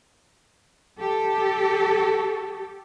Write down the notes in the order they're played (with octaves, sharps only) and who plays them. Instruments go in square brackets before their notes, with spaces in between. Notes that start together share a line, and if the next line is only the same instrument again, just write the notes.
[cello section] G4 A4